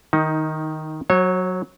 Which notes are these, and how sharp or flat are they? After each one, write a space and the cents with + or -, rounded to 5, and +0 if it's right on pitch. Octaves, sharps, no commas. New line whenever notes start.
D#3 +0 D#4 +20
F#3 +0 C#5 -30